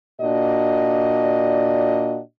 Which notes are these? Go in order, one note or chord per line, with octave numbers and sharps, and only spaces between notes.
A#2 D4 F#4 D5 D#5